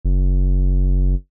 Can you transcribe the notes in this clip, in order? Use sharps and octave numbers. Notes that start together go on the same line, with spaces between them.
F#1